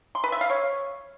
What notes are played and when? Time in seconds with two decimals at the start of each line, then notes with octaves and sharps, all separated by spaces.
0.15 C6
0.24 B4
0.32 E5
0.41 F5
0.50 C#5